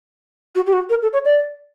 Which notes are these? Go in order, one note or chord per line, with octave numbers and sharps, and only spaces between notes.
F#4
G4
F#4
A#4
A4
C#5
D5